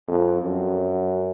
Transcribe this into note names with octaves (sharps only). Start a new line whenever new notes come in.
F2
F#2